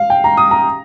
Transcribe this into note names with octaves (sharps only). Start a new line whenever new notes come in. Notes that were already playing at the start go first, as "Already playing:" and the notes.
Already playing: F5
G5
A#5
D#6
A#5